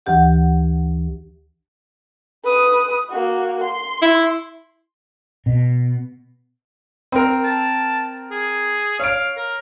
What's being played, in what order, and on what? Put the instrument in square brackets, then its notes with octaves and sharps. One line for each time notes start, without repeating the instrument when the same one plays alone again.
[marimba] D2 E3 G4 F#5
[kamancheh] B4 D#6
A#3 F#4
C6
[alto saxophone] E4
[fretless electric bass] B2
[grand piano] C4 A#4
[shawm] A5
G#4
[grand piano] C#5 D7 [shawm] F5
[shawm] A#4